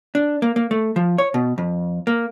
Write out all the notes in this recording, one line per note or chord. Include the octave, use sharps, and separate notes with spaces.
D4
A#3
A#3
A3
F3
C#5
B2
F2
A#3